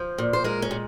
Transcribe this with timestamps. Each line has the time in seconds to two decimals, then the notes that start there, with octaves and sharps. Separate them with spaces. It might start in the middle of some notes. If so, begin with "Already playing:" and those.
Already playing: F3 C5
0.18 A#2
0.33 C5
0.44 G#3 A#4
0.62 C#4
0.71 A#2